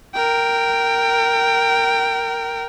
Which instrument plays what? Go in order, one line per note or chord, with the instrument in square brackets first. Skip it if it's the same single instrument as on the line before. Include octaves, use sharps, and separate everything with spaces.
[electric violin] A#4 G5